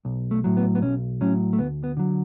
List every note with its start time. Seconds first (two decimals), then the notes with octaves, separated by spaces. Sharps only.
0.05 B1
0.31 A3
0.44 A2 F#3
0.57 B3
0.75 B3
0.81 B1 C#4
1.21 A2 F#3 C#4
1.53 A3
1.59 D2 B3
1.84 B3
1.97 D3 F#3